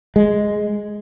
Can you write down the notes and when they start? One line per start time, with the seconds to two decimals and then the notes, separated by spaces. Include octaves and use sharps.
0.16 G#3